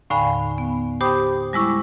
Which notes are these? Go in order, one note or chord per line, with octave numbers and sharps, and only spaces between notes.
D#2 A2 D3 F5 G#5 B5
B3
G4 C5 G5 B5 D6 D#6
G3 G#3 E4 C#6 D6